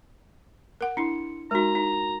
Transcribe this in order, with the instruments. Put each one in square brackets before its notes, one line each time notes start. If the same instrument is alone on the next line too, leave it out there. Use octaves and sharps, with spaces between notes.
[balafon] A#4 F#5
[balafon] D4 E4 [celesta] C6 C#7
[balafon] G#3 D#4 [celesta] F#4 A#4 [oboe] A#5
[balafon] D#4